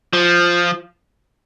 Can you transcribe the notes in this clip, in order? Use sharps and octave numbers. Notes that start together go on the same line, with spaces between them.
F3